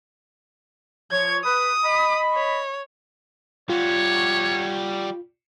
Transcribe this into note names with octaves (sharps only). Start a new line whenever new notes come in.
F3 F4 C#5 G#6
B4 D#6
D#5 B5
C#5
G3 F4 F#4 C#5